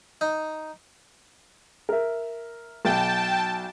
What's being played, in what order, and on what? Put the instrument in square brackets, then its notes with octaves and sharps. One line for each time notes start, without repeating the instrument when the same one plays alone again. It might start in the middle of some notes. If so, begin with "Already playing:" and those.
[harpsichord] D#4
[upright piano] A#4 E5
[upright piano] B1 [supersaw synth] G5 A5